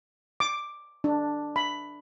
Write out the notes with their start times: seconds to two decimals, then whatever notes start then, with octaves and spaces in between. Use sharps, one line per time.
0.40 D6
1.04 D4
1.56 B5